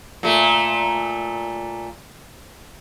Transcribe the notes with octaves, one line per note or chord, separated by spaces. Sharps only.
A#2 A3